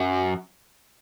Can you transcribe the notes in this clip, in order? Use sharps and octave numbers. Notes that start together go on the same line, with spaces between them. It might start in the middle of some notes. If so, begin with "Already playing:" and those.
Already playing: F#2